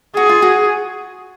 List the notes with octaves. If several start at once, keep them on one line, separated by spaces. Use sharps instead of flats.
F#4 G#4
F4
F#4